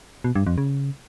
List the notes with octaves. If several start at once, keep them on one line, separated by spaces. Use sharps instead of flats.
B2
G2
F2
C#3